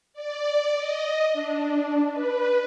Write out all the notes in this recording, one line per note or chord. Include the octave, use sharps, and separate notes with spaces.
D5
D#5
D4
B4